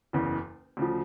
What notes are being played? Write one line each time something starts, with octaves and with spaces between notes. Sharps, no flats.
F#1 E2 C#3 E3
D2 C#3 F3